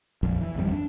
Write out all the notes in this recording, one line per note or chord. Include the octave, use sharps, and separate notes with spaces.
A#1 F2
E3
G#1 F2 G3
D4